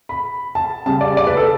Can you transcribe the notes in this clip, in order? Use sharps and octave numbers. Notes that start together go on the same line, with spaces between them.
B5
A5
C#3 G3 A5
D5
D5
B4
A4